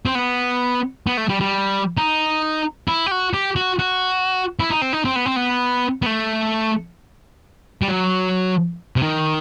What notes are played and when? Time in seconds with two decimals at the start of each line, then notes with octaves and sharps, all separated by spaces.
0.06 C4
0.15 B3
1.07 B3
1.17 A3
1.29 G3
1.40 G3
1.97 D#4
2.88 E4
3.06 G4
3.11 F#4
3.34 G4
3.56 F#4
3.79 F#4
4.60 E4
4.70 D#4
4.82 C4
4.93 D#4
5.05 C4
5.16 B3
5.26 C4
5.36 B3
6.02 B3
6.06 A3
7.82 G3
7.88 F#3
8.96 C3
9.03 D#3